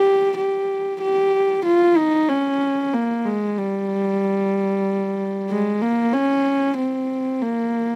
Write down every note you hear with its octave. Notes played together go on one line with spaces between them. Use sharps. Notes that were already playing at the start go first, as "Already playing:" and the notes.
Already playing: G4
G4
G4
F4
D#4
C#4
A#3
G#3
G3
G#3
A#3
C#4
C4
A#3